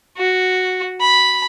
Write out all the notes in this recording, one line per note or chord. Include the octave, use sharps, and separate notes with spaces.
F#4
B5